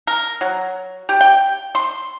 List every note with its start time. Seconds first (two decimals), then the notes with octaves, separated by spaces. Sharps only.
0.07 A#4
0.41 F#3
1.09 G4
1.21 G5
1.75 C6